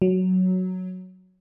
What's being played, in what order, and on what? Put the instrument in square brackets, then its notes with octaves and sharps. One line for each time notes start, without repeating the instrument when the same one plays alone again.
[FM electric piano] F#3